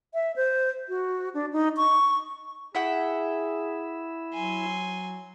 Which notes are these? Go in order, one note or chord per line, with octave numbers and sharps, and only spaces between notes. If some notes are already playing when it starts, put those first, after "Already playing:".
E5
C5
F#4
D4
D#4
C#6
E4 G#4 E5 F#5 G5
F#3 G#5 C6